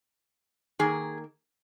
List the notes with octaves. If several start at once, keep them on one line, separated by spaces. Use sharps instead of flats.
D#3 A#3 G#4